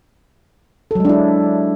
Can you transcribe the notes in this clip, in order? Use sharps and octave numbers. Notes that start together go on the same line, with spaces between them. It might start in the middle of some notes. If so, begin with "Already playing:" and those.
F#3 G#3 D4 E4 A4